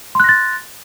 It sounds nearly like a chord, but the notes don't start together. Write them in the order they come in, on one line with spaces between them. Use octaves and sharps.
C6 F#6 A#6 A6